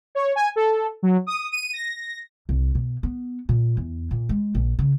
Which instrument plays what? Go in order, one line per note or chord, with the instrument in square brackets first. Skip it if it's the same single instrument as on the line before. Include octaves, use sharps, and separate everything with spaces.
[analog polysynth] C#5
G#5
A4
F#3
D#6
D#7
A#6
[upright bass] C2
B2
B3
A#2
E2
A#2
G#3
A#1
C#3